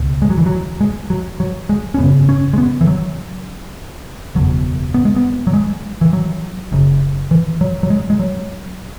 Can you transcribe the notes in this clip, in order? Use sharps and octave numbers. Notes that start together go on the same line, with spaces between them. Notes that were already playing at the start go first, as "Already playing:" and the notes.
Already playing: C#2 B2
G#3
F#3
E3
F#3
G#3
F#3
F#3
G#3
C#4
G#1 F#2 C#3 B3
C#4
G#3
B3
E3
F#3
F#1 E2 B2 F#3
B3
G#3
B3
F#3
G#3
E3
F#3
F#1 F#2 C#3
E3
F#3
F#3
G#3
G#3
F#3